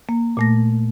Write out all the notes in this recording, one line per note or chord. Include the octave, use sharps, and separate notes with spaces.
A#3
A#2 A3 A#6